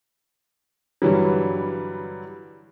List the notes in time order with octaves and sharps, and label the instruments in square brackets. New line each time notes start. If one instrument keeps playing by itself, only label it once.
[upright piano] G2 D3 E3 F#3 G3